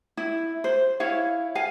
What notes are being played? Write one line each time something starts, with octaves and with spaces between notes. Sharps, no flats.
E4
C5
E4 C#5 F5
F5 G#5